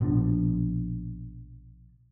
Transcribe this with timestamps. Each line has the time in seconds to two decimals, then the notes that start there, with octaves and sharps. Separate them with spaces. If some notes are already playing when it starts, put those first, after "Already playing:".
0.01 A#1 B2 F3 D4